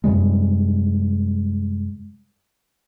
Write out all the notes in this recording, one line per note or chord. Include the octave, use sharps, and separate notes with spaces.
F#2 C3 G3 G#3